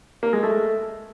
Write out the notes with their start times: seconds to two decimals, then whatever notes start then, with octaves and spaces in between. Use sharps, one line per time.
0.23 A#3
0.33 G#3
0.43 A3